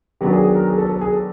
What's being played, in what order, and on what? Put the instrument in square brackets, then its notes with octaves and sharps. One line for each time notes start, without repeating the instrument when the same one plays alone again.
[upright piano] D#3 F#3 B3 D4 [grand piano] G4
[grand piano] G#4
G#4
A#4
G#4
A4
A4
G#4
A4